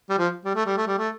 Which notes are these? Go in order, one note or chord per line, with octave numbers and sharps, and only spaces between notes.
G3
F3
G3
A3
G3
A3
G3
A3